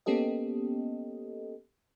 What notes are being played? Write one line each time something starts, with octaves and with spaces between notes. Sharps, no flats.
A#3 B3 C#4 G4 A4 D#5